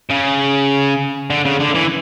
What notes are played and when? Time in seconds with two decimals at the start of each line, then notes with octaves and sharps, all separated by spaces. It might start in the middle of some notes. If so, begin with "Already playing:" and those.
0.11 C#3
1.30 D3
1.45 C#3
1.60 D3
1.75 E3